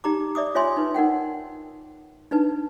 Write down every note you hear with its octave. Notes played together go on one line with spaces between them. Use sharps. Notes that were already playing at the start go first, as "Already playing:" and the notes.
D#4 G4 A#5 D6
D5 E5 D6 D#6
F4 C#5 E5 G#5 C6
D#4 B4
D#4 A#4 F#5 G5
D4 D#4 B4 A5